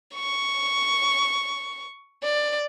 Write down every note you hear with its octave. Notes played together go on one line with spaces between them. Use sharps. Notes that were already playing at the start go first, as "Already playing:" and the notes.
C#6
D5